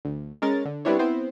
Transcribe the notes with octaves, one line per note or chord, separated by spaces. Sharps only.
D2
G#3 C#4 A#4 A6
D3
G3 B3 C4 D4 E4 C#5
B3 C4 E4 C5